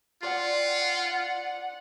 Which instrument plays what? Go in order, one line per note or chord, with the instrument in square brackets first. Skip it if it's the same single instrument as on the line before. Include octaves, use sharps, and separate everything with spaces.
[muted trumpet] F4 [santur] C5 D5 G5 [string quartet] F#5